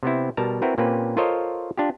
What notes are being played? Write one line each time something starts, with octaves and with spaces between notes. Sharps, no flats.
C3 B3 C4 E4
B2 G3 A#4 A5 A#5
C4 E4 F#4 A#4 B4
A#2 A#3 C4 C#4 G4 B4
F4 A4 A#4 C5 C#5 D#5
D4 F4 G4